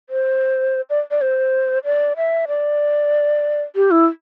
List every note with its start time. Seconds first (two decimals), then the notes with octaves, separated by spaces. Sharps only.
0.10 C5
0.90 D5
1.11 D5
1.21 C5
1.84 D5
2.17 E5
2.48 D5
3.76 G4
3.91 E4